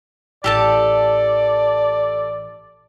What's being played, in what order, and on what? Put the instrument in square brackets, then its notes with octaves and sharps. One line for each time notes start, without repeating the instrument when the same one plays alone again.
[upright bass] A1 [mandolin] G4 A4 A5 [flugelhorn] D5